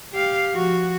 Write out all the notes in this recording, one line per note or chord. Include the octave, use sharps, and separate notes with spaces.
G4 F5
F3 F#4